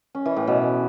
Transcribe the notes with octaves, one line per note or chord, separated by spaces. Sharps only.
C#4
E3
A2
B2